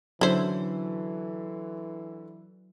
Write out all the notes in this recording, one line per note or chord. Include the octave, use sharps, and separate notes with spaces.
D3 E3 F#3 C#4 E4 C5